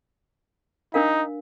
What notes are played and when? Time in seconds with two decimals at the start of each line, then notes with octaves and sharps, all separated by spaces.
0.94 D4 D#4 A#4 F5